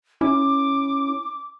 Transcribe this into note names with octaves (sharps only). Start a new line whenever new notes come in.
C#4 E4 D6